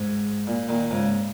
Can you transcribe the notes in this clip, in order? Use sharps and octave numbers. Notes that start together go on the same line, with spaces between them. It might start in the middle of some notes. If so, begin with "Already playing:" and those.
Already playing: G#2
A#2
A#2 D#3
G#2 C#3